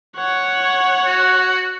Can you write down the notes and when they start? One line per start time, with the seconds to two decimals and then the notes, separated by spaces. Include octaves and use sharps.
0.17 C#5 F#5
1.07 F#4